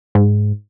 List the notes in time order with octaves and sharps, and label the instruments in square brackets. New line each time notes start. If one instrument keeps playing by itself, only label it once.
[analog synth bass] G#2